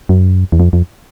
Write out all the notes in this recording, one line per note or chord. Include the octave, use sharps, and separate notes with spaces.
F#2
E2
F2
F2